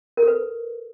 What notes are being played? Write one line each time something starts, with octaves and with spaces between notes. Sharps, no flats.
A#4
A4
B4